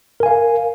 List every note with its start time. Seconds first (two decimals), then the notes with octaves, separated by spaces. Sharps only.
0.20 A#4
0.23 G#5
0.26 F5